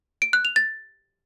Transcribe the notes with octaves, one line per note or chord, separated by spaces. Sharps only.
D7
F#6
F7
A6